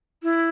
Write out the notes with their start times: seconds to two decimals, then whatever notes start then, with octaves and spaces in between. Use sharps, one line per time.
0.23 E4